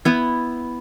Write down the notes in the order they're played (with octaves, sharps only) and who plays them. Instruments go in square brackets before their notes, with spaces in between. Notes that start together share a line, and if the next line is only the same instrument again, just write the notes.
[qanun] B3 E4